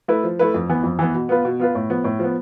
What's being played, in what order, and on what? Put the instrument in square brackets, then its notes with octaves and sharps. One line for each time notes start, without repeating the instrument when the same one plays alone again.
[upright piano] A3 E4 B4
F3
A3 E4 B4
F2
E3 B3
F2
E3 B3
B2
B3 F4 B4
B2
B3 F4 B4
A2
F3 B3
A2
F3 B3